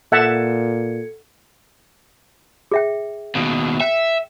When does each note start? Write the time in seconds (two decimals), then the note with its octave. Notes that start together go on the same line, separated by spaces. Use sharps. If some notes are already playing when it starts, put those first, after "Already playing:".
0.12 A#2 A4 E5 F#5 A5 G#6 C#7
2.72 G#4 E5 G5
3.35 D#2 B2
3.81 E5 G5